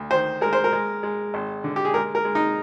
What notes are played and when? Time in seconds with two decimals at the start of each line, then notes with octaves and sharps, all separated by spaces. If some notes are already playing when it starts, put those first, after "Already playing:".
Already playing: D2
0.11 D#3 C5
0.41 G#3 A#4
0.53 C5
0.64 A#4
0.73 G#3
1.03 G#3
1.34 G#1
1.64 D3
1.76 G4
1.85 G#4
1.94 G#3 A#4
2.15 A#4
2.25 G#3
2.35 D#4